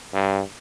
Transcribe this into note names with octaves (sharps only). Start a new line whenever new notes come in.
G2